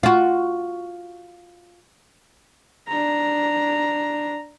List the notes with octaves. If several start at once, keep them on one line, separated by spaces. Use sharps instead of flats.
F4 F#4
D4 A#5